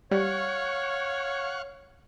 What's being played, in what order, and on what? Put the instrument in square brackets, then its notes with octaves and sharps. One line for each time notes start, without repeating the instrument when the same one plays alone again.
[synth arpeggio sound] G3 [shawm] C#5 [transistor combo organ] F5 F#5 C#6